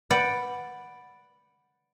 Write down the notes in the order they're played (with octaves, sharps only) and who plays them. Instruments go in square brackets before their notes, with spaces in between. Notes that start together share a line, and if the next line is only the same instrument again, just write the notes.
[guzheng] B4 D5 F#5 G5